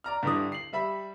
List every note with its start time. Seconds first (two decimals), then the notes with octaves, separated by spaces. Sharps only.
0.04 D5 A#5 F6
0.23 G2 D3 G3 E4 D#6
0.52 C7 F#7
0.73 G3 E5 B5